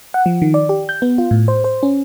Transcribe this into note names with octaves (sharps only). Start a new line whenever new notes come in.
F#5
F3
D#3
D5
G4
G6
B3
F4
A2
C5
C5
C#4